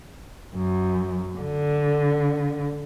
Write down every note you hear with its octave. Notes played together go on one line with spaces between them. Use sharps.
F#2
D3